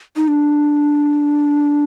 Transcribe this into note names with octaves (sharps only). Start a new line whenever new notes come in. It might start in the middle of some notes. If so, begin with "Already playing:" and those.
D#4
D4